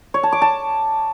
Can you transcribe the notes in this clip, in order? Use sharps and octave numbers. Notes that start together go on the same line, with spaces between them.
C#5
A5
D6
A5